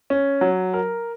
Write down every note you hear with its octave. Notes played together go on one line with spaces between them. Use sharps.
C#4
F#3
A#4